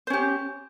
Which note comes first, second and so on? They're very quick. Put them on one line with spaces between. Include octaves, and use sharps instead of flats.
C5 C#4 G4